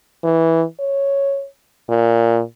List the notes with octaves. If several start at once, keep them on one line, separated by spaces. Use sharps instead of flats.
E3
C#5
A#2